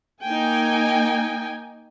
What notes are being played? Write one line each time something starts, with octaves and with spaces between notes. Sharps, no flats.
A#3 D#4 G5 G#5